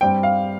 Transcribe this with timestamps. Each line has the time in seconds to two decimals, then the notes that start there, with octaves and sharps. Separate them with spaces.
0.01 G2 G3 C4 G5
0.23 F5